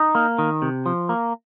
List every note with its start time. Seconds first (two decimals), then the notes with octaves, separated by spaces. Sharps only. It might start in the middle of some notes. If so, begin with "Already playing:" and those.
Already playing: D#4
0.15 A#3
0.38 D#3
0.62 C3
0.86 F3
1.09 A#3